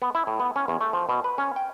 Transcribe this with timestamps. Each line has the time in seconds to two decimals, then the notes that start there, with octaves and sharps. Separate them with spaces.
0.02 B3
0.15 E4
0.27 A2
0.40 B3
0.56 C#4
0.68 E2
0.81 A3
0.93 F3
1.09 B2
1.24 B4
1.38 C#4
1.56 G5